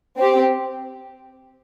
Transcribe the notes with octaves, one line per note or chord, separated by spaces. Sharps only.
C4 G4